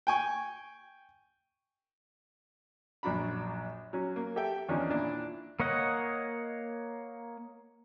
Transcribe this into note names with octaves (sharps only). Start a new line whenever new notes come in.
G5 G#5 C#6
A#1 F#2 D4 F#4 A#5 B5
F#3 C#4
A#3
G4 A4 E5 G5
E2 D#3 F3 C#4 D4 D5
A#2 D4 E4
A#3 C#5 D#5 F#5